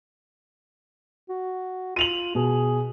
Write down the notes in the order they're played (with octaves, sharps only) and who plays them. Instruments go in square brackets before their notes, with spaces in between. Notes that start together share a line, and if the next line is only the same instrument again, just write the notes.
[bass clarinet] F#4
[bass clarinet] F4 [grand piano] D#7 F7 F#7
[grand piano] B2 [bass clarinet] G#4